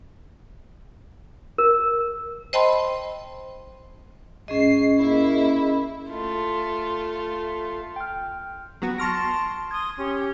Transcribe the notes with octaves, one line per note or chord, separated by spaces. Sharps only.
A#4
C5 D#5 G5 A5 B5 C6
G#2 C#4 G#4 D#5 C7
A#3 E4
A3 F4
G5 F6
F#3 B3 F#4
A5 C6 C#6 F6 A#6 D7
C6 D#6 G#6
C#4 G4